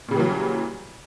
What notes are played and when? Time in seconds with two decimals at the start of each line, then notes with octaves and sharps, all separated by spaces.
0.08 A#2
0.11 C#3
0.14 G3
0.17 E3
0.19 F#3